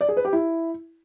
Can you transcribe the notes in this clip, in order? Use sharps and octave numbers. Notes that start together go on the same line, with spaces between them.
D5
G#4
B4
G4
E4